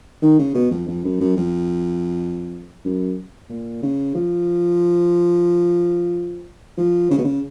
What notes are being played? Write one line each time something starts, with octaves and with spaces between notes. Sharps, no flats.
D#3
C#3
B2
F2
F2
F#2
F#2
F2
F#2
A#2
C#3
F3
F3
C#3
B2
C#3